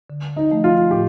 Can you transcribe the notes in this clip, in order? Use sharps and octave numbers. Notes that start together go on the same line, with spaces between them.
D3
D#4
F3 A3
F4
A2 G4